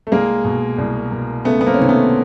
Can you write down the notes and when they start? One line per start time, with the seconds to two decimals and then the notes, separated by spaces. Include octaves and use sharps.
0.07 A3
0.12 C2 G#3 A#3
0.45 B2
0.78 C2
1.12 B2
1.45 C#2 A3 B3
1.61 B3
1.66 A#3 C4
1.74 C#4
1.78 C3 D#3 C4
1.89 A3 B3